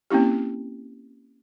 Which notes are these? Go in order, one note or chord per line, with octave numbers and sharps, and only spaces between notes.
A#3 C4 C#4 E4 G4